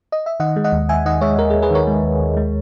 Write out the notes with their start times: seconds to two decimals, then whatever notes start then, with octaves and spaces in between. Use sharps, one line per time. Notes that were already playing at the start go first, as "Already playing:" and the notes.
0.12 D#5
0.26 E5
0.40 D#3 D#5 F#5
0.56 G#3
0.64 D#5 F#5
0.72 D#2
0.89 D#2 E5 G#5
1.05 D#3 D#5 F#5
1.21 G#3 C#5 E5
1.38 D#2 A#4
1.50 G#4
1.55 D#2
1.62 G#4 B4
1.71 D#3 A#4 C#5
1.87 G#3
2.03 D#2
2.20 D#2
2.37 G#3